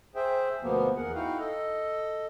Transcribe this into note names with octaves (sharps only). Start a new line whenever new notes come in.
G#4 C5 E5 G5
D2 B2 F3 A#3 B3
E2 G#4 A#4 F#5
D#4 E4 F#4 F5 G5
A4 D#5